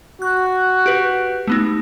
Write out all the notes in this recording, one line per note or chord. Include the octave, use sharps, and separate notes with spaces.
F#4 F#6
G4 B4
A3 B3 D#4